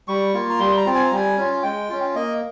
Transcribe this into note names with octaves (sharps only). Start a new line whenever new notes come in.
G3 C#6
A#3 F4
A#5
G3 C6
A#5
C4 F4
G#5
A#5
G3 G#5
C#4 F4
G#3 G5
C#4 F4
A#3 D#5